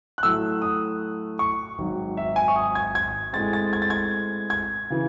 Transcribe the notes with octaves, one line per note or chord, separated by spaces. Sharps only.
F#6
A2 F#3 A3 E6
D#6
C#6
G#1 G#2 F#3
E5
G#5
C#6
D#6
G#6
G#6
A2 G#3 C4 A6
A6
G#6
A6
G#6
G#6
C#3 E3